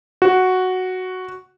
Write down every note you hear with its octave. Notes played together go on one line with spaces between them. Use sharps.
F#4